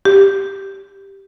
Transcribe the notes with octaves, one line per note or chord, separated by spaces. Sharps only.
G4